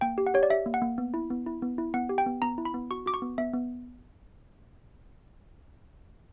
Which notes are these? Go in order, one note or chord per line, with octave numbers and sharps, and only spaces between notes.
A#3 G5
G4
F#5
G4 C#5
D5
G4 E5
A#3
F#5
A#3
B3
E4
B3
E4
B3
E4
B3 F#5
G4
G5
B3
B3 A#5
E4
B5
B3
F#4 C#6
F#4 D6
C#6
B3
B3 E5
B3